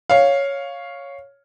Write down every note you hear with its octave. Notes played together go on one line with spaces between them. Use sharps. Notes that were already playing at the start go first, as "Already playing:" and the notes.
C#5 F5